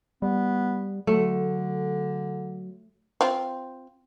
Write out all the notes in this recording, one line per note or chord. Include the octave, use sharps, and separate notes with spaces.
G3 B3
D3 F#3 A3
C4 F4